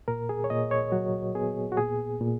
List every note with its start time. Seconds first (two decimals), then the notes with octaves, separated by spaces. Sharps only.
0.08 A#2 A#4
0.29 G#4
0.44 C#5
0.50 A#2 D#5
0.71 C#5
0.92 F#3 F#4
1.35 B3 G#4
1.72 F#4
1.77 A#2 G#4
2.20 A#2